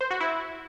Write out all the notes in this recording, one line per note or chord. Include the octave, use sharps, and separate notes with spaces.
C5
F#4
E4